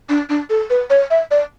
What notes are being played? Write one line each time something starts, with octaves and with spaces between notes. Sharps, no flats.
D4
D4
A4
B4
C#5
E5
D5